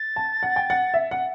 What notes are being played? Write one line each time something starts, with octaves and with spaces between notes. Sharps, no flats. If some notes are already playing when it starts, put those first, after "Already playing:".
Already playing: A6
A5
F#5
G5
F#5
E5
F#5